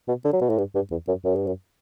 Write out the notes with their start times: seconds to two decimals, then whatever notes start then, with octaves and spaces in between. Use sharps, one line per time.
0.08 B2
0.25 D3
0.33 F#3
0.41 B2
0.50 A2
0.58 G2
0.75 G2
0.91 E2
1.08 F#2
1.24 F#2
1.35 G2
1.47 F#2